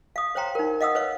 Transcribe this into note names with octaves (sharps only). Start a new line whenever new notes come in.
F5 D#6
C5 C#5 F5 G5 A#5 C6
D#4 A#4
D#5 F5 F#5 D#6 E6
B4 C#5 F5